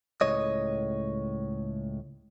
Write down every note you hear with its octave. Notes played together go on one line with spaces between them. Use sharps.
C#2 A2 C#5 D#5